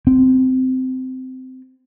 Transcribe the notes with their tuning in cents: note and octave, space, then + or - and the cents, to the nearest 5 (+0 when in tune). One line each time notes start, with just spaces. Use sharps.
C4 -15